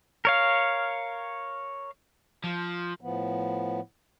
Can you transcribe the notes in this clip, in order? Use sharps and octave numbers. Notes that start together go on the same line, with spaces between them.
A#4 C#5 F5
F3
A2 F3 B3